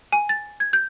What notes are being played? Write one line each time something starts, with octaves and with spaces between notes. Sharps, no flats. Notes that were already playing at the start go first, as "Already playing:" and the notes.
G#5
A6
G#6
G6